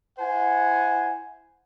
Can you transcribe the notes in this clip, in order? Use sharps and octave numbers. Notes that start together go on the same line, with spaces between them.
E4 C5 F#5 G#5